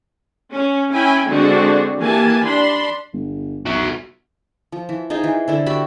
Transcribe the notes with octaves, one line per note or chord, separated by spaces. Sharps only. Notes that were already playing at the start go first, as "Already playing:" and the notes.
C#4
C#4 E4 G5 G#5 B5
D3 G#3 C4 D4 F#4
E3 A#3 G4 G#5 A5
D4 B5 C6
G1
B1 F#4 E5
F3
E3
D#4 F4 G#4 C5
E3
D3 E4 A4
F#4 G4 E5 B5